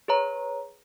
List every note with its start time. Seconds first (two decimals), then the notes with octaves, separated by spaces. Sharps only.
0.08 G#4 B4 C#5 A#5